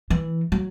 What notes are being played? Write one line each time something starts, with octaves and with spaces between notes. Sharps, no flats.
E3
F#3